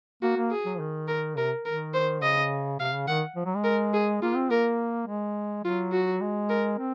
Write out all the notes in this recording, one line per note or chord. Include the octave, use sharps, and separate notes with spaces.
A#3 F#4
A#3
G#4
F#3
F3
D#3
A#4
C3 A#4
D#3 A#4
C5
C#3 D#5
C3 F5
C#3
D#3 F#5
F3
F#3
G#3
A#4
G#4
A#3 F4
C4
A#3 A#4
G#3
F#3 F4
F#4
G#3
A#4
C4